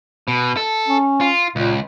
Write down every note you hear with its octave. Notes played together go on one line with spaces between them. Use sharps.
B2
A4
C#4
F4
C#2 A#2